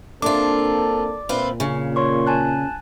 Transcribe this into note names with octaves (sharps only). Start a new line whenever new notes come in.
A#3 C4 D4 F4 A4 D5 D6
A#2 C4 F4 B4
C#3
C#5 C6 C#6
G#5 A5 F#6